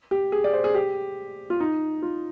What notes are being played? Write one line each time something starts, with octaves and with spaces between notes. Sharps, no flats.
G4
G#4
D5
C5
G#4
G4
F4
D#4
F4